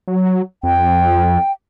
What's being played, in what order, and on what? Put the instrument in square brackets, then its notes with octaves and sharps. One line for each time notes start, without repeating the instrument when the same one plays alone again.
[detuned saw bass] F#3
[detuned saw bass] F2 [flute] G5